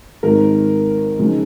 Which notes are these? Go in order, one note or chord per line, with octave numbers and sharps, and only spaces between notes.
G#1 G#2 D#3 A#4
C#2 C#3 F3 G#3 D#4